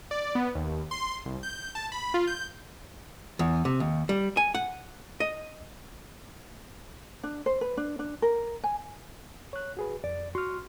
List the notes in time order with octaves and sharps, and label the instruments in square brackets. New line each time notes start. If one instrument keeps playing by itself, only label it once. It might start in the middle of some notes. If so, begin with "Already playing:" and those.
[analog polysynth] D5
B3
D#2
C6
C2
G6
A5
B5
F4
G6
[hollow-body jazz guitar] E2
C3
D#2
G3
G#5
F#5
D#5
[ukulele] D4
C5
B4
D4
D4
A#4
G#5
[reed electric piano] C#5 F#6
F#4 G#4 B4
[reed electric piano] F2 [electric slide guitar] D5
[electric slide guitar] F#4 [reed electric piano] C6 F6